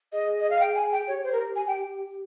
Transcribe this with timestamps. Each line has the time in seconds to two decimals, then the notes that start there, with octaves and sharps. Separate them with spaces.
0.12 G#4 D#5
0.40 D#5
0.50 F5
0.60 G5
0.76 G#5
0.92 G5
1.07 G4 C#5
1.23 C5
1.32 A#4
1.56 G#5
1.67 G5